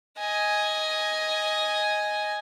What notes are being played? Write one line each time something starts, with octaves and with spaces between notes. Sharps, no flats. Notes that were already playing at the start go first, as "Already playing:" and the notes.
D#5 G#5